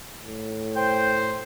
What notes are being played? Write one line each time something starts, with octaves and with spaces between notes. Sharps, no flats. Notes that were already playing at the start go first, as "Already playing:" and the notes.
A2
C5 G5